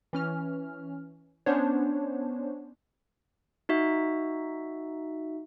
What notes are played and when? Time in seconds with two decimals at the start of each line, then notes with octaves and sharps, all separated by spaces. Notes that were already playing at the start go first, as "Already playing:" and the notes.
0.13 E3 C#4 F6
1.46 B3 C#4 D4 C5 C#5
3.69 D#4 F#4 E5